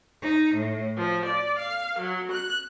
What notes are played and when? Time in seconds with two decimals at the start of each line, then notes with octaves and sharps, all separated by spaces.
0.22 D#4
0.55 A2
0.96 F3
1.25 D5
1.59 F5
1.99 F#3
2.32 F#6